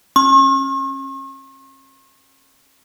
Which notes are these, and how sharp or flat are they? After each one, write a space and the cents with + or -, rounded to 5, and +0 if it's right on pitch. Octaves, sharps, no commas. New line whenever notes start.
C#4 -35 C#6 -45